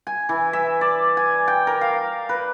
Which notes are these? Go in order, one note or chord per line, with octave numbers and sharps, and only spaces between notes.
G#5
E3
E5
D5
G#5
G5
A#4
F5
B4